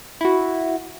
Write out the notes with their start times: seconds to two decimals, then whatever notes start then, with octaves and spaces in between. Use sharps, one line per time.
0.21 E4 F#4